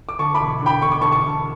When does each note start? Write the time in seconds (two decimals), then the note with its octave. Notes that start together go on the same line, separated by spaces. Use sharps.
0.09 D6
0.19 D2 A5 C#6
0.34 B5 D6
0.40 E1
0.61 D3
0.66 G5 B5
0.82 E1 C#6
0.92 D6
1.01 D2 A5 C#6
1.12 A5 C#6
1.22 E1